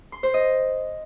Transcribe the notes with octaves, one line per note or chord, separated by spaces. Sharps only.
C6
C5
D#5